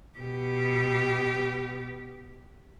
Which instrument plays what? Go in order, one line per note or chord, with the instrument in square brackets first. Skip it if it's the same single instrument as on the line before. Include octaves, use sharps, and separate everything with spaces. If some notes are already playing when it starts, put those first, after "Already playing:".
[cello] B2 G4